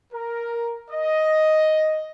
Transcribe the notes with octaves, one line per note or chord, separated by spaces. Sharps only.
A#4
D#5